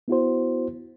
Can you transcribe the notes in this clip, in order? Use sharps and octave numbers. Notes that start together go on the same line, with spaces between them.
B3 E4 F#4 C5